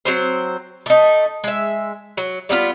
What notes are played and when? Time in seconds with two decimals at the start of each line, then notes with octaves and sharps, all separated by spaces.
0.05 F#3 C4 C5
0.86 A3 D#4
1.44 G#3 E5
2.17 F#3
2.49 G3 B3 D#4 F4